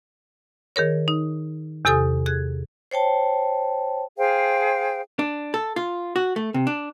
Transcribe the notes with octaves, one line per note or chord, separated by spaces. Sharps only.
D#3 G#4 A#4 C#5
D#4
E2 C3 G4 A4 G#5 D#6
G#4 F#6 G#6
C5 C#5 G5 A5
G#4 C5 F5 G5
D4
A4
F4
F#4
A3
C3
D4